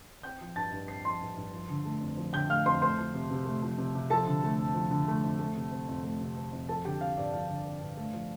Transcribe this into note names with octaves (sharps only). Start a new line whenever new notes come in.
C4 G5 G6
F3
G2 A5 A6
G2
C4 C7
F3 C6 C7
G2
G2
F3
D3
A3
F2
F3
D3 G5 G6
A3 F5 F6
F2 C5 C6
A3 C5 C6
F3
C3
C3
A3
F3
C3
C3
F3 A4 A5
D3
A3
F2
F3
D3
A3
F2
A3
C3
C4
F2
A3
C3
C4
F2
F3 A4 A5
D3 G4 G5
C4 F5
G2 D5
F3 F5
D3
C4
G2
A3
F3